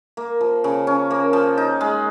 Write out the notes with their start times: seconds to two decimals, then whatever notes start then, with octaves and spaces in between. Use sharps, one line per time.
0.17 A#3
0.41 F3
0.64 C#3
0.87 C#4
1.11 A#3
1.33 F3
1.57 D#4
1.81 G#3